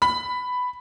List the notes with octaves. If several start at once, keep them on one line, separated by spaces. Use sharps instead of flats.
B5